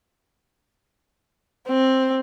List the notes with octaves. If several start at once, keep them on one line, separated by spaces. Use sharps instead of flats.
C4